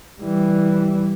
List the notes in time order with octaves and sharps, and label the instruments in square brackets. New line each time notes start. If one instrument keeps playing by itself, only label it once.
[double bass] E3 G3